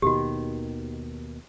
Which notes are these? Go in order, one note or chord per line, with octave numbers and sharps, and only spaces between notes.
D#2 B2 D#3 F#4 G4